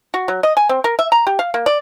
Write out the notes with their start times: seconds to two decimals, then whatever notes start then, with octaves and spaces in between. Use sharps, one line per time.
0.14 F#4
0.28 F#3
0.43 D#5
0.57 G#5
0.69 C4
0.84 A#4
0.99 E5
1.12 A#5
1.27 G4
1.39 F5
1.54 A#3
1.66 D5